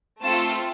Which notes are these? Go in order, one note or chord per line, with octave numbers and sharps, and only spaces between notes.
A3 C4 F4 A4 A5